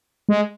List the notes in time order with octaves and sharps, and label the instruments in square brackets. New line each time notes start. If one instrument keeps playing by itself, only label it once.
[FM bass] G#3